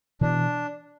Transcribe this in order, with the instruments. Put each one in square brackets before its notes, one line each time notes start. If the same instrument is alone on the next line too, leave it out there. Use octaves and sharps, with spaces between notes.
[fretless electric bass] B2 E3 [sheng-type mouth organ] D4